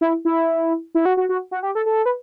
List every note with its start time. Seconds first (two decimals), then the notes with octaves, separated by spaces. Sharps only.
0.01 E4
0.25 E4
0.95 E4
1.05 F#4
1.17 F#4
1.29 F#4
1.51 F#4
1.63 G4
1.75 A4
1.86 A4
2.06 B4